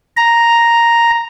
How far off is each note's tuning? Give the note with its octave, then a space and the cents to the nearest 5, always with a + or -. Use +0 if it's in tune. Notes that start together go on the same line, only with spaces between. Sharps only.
A#5 +0